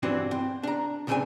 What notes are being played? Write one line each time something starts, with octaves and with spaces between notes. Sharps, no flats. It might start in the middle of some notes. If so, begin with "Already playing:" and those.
G2 E3 C4 D4 F#4
C4
D4 A#5
B1 C#3 G3 C4 D4 G#5